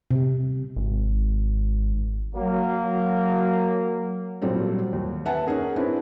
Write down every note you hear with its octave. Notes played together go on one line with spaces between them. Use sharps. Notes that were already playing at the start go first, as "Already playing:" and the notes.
C3
G#1
F#3 A#3
A#2 F#3 G3 C4 A4
D#2
B4 E5 F#5 G#5 A5
C#4 D#4 G#4 A#4
C4 D4 E4 B4 C#5